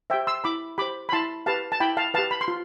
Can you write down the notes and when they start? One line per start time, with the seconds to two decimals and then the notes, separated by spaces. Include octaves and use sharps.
0.10 G4 C5 E5 G5
0.27 C6 E6
0.44 E4 B5 D6
0.78 G4 C5 B5 D6
1.09 B5
1.12 E4 A5 C6
1.46 G4 B4 F5 A5
1.72 A5
1.80 E4 G5 B5
1.97 F5 A5
2.14 G4 B4 F5 A5
2.31 B5
2.41 C6
2.48 F4